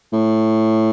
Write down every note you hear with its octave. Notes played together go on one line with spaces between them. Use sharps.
A2